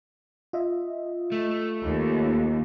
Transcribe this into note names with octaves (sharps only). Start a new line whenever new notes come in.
F4 D#5 E5
A3
D#2